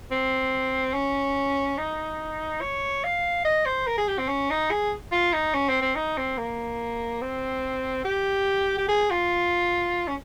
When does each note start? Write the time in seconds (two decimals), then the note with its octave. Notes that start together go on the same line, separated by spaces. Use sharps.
0.12 C4
0.94 C#4
1.78 D#4
2.61 C#5
3.04 F5
3.45 D#5
3.66 C5
3.87 A#4
3.98 G#4
4.08 G4
4.19 C4
4.29 C#4
4.51 D#4
4.71 G#4
5.12 F4
5.33 D#4
5.54 C#4
5.69 C4
5.82 C4
5.96 D#4
6.18 C4
6.38 A#3
7.22 C4
8.05 G4
8.78 G4
8.89 G#4
9.10 F4
10.08 C#4